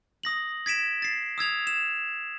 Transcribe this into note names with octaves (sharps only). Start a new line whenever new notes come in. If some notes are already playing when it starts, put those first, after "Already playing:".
D#6 A#6 F#7
G#6 B6 D7 E7
A6 C7
D#6 E6 G#6 F7
E7